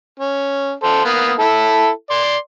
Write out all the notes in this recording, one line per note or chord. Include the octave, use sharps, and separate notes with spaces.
C#4
A4 C5
A#3 B3 D#6
E4 A4
D5 C6